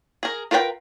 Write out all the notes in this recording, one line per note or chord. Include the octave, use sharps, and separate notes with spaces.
G#4 A#4
F4 A#4 B4 D5 G5